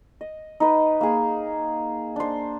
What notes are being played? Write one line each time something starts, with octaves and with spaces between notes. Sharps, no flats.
D#5
D#4 B4
A#3 G#4
D4 C5